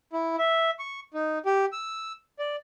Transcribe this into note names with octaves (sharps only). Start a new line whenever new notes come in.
E4
E5
C#6
D#4
G4
E6
D5